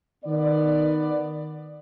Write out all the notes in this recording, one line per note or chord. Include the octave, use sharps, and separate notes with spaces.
D#3 B3 D5